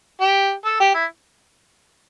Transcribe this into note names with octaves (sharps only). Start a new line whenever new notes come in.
G4
A4
G4
E4